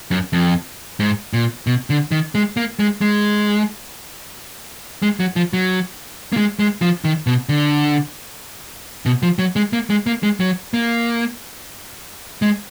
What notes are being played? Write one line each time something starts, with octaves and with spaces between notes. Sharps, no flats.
F#2
F2
G#2
A#2
B2
D3
D#3
G#3
A#3
G#3
G#3
G#3
F#3
F3
F#3
A#3
G#3
G#3
F3
D#3
B2
D3
B2
F3
F#3
G#3
A#3
G#3
A#3
G#3
F#3
A#3
G#3